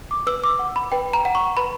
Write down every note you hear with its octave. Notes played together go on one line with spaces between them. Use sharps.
D6
B4 E6
D6
F#5
B5
B4 G5
A#5
F#5
C#6
B4 B5